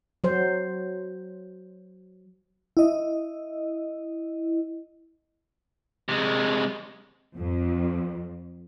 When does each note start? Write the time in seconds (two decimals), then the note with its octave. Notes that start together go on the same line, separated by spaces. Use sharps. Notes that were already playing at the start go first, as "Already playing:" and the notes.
0.24 F#3 C5
2.77 E4 D#5
6.09 C3 G#3
7.36 F2